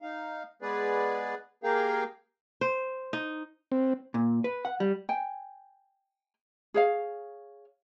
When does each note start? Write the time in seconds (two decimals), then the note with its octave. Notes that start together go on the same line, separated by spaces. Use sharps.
0.02 D#4 F5
0.62 G#3 B3 G#4 B4 D5
1.64 A#3 G4 G#4 A#4 F5 G5
2.61 C5
3.13 D#4
3.72 C4
4.14 A#2
4.44 B4
4.65 F#5
4.80 G3
5.09 G5 G#5
6.74 G#4 C#5 F5